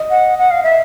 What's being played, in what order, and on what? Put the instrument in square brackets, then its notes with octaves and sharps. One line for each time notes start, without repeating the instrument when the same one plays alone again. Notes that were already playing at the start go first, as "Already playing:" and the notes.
Already playing: [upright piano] D#5
[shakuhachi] F#5
F#5
F5
E5